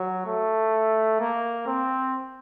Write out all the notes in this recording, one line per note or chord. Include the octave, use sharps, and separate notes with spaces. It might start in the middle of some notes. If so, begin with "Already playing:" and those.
Already playing: F#3
A3
A#3
C4